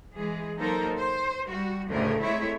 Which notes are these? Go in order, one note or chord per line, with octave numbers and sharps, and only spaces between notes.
E3 G#3 G#4
F#3 A#3 D#4 A4 A#4 C5
C5
G3 F#4
D2 A2 C#3 A3 A#4
G#3 A3 C4 E4 C#5 E5